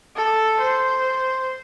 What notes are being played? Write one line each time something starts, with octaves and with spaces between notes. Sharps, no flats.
A4
C5